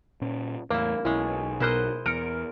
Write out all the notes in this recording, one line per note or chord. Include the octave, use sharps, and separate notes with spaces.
A#2 C#4
E2 A2 A#3 E4 A#4
B1 G#3 C#4 E4
B2 E4 A#4 C5 D#5 F#6
E2 A#4 F6 C#7 D7